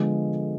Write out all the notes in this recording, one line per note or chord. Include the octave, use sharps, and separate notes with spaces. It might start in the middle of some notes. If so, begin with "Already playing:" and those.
Already playing: D3 F3 G#3 B3